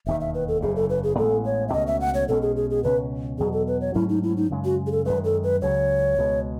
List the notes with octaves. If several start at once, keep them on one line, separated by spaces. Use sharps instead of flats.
E1 D#2 D#3 E5
E5
B4
A4
F#1 E2 C#3 G#4
A4
B4
G#4
A1 A2 G#3 B3 A4
C#5
E5
C#2 B2 A3 C#4 D#5
E5
F#5
C#5
B1 B2 G#3 C#4 A4
G#4
G#4
G#4
C#2 B2 A3 C#4 B4
E2 B2 F#3 G#4
A4
B4
C#5
G#2 F#3 A3 C#4 E4
D#4
E4
D#4
F#2 C#3 G#3
F#4
G#4
A4
F#2 D#3 G#3 B4
A4
B4
C#2 C#3 F#3 C#5
C#2 B2 G#3